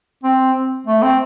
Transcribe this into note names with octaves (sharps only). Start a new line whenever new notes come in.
C4
A3
C4